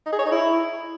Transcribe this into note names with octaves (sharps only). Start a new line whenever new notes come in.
D#4
G#4
C#5
D#4
E4